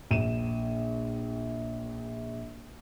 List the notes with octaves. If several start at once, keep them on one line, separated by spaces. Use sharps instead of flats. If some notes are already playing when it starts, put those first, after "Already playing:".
A#1 D#7 E7